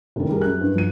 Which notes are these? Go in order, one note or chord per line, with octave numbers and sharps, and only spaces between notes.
F1 D#3
G3 G#4 A#4
F#2 F#6
G2
F3 D#7